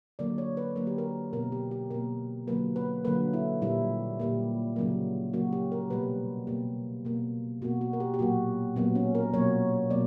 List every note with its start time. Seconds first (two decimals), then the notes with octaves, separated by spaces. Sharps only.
0.19 D3 F#3 A#3 D5
0.38 C#5
0.57 B4
0.75 D3 F#3 A#3 A#4
0.87 G4
0.98 A#4
1.33 B2 A#3 A#4
1.52 G4
1.71 G4
1.91 B2 A#3 A#4
2.48 D3 F#3 A#3 B4
2.76 B4
3.05 D3 F#3 A#3 B4
3.33 E4
3.62 A#2 G3 A#3 E4
4.20 A#2 G3 A#3
4.76 C#3 F#3 A#3
5.33 C#3 F#3 A#3 F#4
5.53 G4
5.72 A#4
5.90 B2 G3 A#3 B4
6.47 B2 G3 A#3 G4
7.05 B2 A#3
7.62 B2 A#3 F#4
7.81 F#4
7.93 A#4
8.00 G4
8.14 G4
8.19 A#2 F#3 A#3 F#4
8.76 A#2 F#3 A#3 B3
8.95 C#4
9.15 A#4
9.33 B2 F#3 A#3 C#5
9.90 B2 F#3 A#3 D5